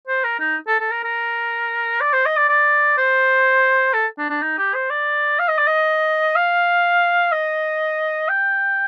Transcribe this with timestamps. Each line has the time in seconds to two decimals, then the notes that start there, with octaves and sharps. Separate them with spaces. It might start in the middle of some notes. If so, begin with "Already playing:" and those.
0.08 C5
0.24 A#4
0.40 D#4
0.68 A4
0.80 A4
0.92 A#4
1.04 A#4
2.01 D5
2.13 C5
2.26 D#5
2.37 D5
2.49 D5
2.98 C5
3.94 A4
4.18 D4
4.30 D4
4.42 D#4
4.58 G4
4.74 C5
4.90 D5
5.39 F5
5.48 D#5
5.58 D5
5.67 D#5
6.36 F5
7.32 D#5
8.29 G5